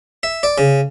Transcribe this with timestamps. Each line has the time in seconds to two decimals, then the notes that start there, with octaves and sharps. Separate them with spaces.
0.23 E5
0.43 D5
0.58 C#3